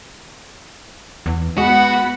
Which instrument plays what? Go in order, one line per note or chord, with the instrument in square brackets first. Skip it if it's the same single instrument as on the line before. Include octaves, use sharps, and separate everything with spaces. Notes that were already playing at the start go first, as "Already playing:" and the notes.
[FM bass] E2
[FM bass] G#3 [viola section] B3 F#5 B5 [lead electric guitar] F#4